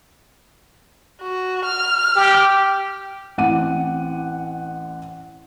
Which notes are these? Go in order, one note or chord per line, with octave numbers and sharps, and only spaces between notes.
F#4
F6
G4
A1 C4 F#5 D6 D#7